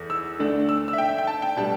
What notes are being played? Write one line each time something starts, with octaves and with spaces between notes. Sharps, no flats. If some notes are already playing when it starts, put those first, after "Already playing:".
Already playing: E2 A3
E6
D2 D3 A3 D4
E6
E6
E5
G5
E5
G5
A5
G5
B2 G3 D4 A5